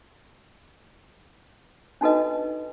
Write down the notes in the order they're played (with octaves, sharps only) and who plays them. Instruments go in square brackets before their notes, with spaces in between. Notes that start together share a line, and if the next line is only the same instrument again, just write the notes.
[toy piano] D4 D#4 F#4 A4 B4 D#5